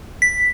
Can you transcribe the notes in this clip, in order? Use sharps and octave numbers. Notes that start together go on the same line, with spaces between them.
B6